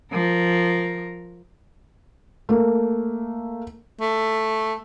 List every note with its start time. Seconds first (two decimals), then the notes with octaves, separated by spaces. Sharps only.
0.12 F3 A#4
2.49 A3 A#3
4.01 A3